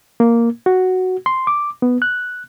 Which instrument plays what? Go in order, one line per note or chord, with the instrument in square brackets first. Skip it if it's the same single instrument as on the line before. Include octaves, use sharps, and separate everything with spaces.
[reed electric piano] A#3
F#4
C6
D6
B3
F#6